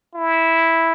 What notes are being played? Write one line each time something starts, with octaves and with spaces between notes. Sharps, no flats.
E4